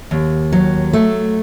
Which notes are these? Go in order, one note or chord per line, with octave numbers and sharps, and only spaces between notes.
D#2
F#3
A3